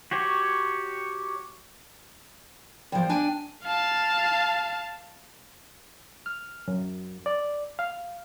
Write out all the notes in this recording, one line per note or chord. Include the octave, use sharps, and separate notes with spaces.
F#4 G4 C#5
E2 F3 G5
D4 G#5
F5 A5
F6
F#2
D5
F5